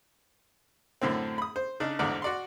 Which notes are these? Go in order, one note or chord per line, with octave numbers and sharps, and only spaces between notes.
F#2 A2 D3 C4
B5 D#6
C5
C#3 D4 D#4
A1 E2 G#2 D3 D5
F#4 D5 C6